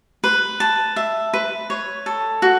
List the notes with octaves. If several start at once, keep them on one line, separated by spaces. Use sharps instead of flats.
B4
A5
E5
B4
C#5
A4
F#4